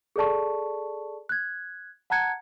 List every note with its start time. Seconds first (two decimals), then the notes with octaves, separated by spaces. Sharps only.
0.16 G#4 A4 D5 A5 C#6
1.29 F#6 G#6
2.10 F#5 A5 A#5 F#6 G#6 C#7